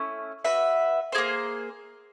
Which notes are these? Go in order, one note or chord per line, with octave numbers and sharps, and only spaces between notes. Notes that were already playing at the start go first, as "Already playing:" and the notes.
Already playing: A3 C#4 E4
F#4 B4 E5
D#4 G#4 C5
A#3